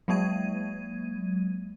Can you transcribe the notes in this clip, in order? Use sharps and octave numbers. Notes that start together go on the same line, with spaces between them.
F#3 G#3 A#3 G#6 D#7